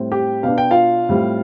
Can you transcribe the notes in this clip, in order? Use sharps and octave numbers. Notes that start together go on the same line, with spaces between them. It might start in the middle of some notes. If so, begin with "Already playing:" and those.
Already playing: A2 G3 C4
G4 G5
B2 B3 D4 F5
G5
F4 F5
A2 G3 C4